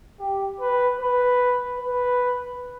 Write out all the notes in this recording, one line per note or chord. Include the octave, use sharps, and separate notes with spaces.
G4
B4
B4
B4